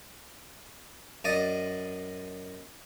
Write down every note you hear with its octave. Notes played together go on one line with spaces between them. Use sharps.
F#2 D5 D#5